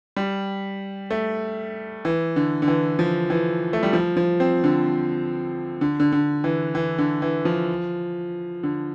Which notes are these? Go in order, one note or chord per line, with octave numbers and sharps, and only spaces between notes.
G3
A3
E3
D3
D3
E3
F3
E3
A3
G3
F3
F3
C4
D3
D3
D3
D3
E3
E3
D3
E3
F3
D3